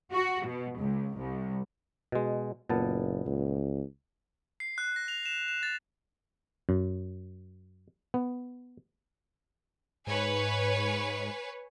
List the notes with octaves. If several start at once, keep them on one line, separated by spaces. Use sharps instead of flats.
F#4
B2
C#2
C2
B2 G#3
F#1 A#2 B3 A5
C#2
C7
F#6
A#6
F7
E7
E7
A6
F#2
B3
G#2 B4 C#5 G#5